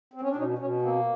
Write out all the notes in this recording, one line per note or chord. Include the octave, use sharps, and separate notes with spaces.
C4
C#4
D4
B2 C#4 D#4
B2 C#4
A#3 C4